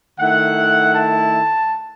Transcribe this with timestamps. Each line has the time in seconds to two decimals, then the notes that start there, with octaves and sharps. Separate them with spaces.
0.18 D#3 A3 E4 F#5
0.94 A5